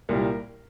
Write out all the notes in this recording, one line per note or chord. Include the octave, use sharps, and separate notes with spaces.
C2 A#2 G3 A#4